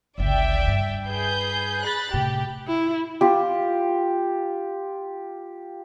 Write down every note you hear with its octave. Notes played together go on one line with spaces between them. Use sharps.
G1 C#2 D5 E5 G5
G2
G#4 B4 G6
B5 F#6 A6
A2 C3 G4
E4
F4 G4